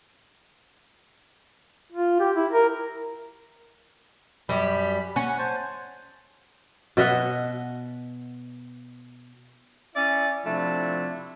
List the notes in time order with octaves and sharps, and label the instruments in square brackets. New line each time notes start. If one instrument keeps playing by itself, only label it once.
[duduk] F4
G4
E4
A#4
[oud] F#2 G3 [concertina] B5
[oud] C#4 [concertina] F#5 C#6 F#6
[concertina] C5 G#5 A5
[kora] B2 D#5 E5 F#5
[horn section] C#4 E4 D5 E5
C3 F3 A3 D4 E4